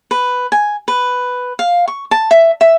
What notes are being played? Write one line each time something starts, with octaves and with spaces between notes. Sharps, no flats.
B4
G#5
B4
F5
C#6
A5
E5
E5